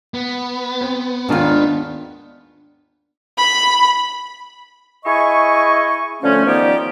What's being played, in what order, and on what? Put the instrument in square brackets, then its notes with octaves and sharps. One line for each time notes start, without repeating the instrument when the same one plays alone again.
[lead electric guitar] B3
[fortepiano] C4
[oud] D#2 D4 [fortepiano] G#2 D#3 F4
[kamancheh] B5
[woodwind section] E4 G#4 D#5 G#5 C#6
D3 F3 A3 C#4
D#3 F3 B3 D#4 G4 D5